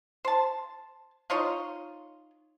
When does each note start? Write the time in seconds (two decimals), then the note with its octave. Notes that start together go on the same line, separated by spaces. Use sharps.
0.25 C5 A5
1.30 D#4 F4 C#5 D#5